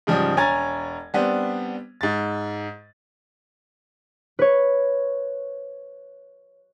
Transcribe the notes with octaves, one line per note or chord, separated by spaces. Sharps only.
G#2 C#3 F3 G3
E1 C#5 G#5 A#5 G#6 A6
G3 B3 C4 D4
G#2 A6
B4 C#5